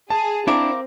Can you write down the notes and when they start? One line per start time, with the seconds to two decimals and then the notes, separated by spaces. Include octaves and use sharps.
0.10 G#4 A5
0.48 C4 D4 E4 A#4 F5 D6